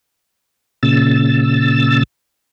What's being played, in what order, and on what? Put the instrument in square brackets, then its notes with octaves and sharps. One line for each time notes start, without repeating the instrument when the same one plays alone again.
[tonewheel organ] A#2 C#3 E6 A6